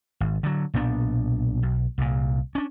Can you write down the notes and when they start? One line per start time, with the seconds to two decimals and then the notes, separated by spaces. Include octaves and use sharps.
0.20 G#1
0.43 D3 F#3
0.74 B1 A#2 B3 D4
1.63 B1
1.98 C2 A#2
2.55 C#4 D4